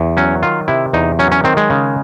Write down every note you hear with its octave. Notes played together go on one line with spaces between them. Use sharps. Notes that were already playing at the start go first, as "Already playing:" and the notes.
Already playing: E2
F#3 C#4
D#3 F4
C3 E4
E2 D#4
F#3 C#4
C#4
D#3 C4
G#3
C#3